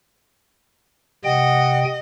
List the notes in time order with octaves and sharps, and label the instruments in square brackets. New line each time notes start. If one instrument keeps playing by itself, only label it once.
[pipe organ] C3 G5 [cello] D#5 [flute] F#5